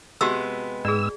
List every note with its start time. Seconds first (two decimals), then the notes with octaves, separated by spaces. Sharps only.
0.21 C3 G#3 B3 F#4 G4 E6
0.85 G#2 G#4 D5 E6